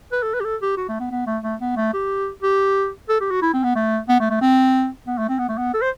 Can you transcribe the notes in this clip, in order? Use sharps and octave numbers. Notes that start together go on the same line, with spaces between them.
B4
A4
B4
G4
A4
G4
F#4
A3
B3
B3
A3
A3
B3
A3
G4
G4
A4
G4
F#4
E4
C4
B3
A3
B3
A3
A3
C4
B3
A3
C4
B3
A3
B3
A4
C5